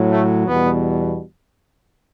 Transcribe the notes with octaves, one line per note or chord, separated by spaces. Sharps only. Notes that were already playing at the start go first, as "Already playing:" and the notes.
Already playing: A2 F#3
A3
E2 B2 G3 B3